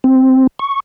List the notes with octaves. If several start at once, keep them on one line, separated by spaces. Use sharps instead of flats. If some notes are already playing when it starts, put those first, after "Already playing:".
C4
C#6